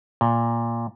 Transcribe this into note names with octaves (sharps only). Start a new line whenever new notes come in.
A#2